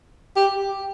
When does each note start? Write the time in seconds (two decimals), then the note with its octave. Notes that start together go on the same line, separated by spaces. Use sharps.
0.36 G4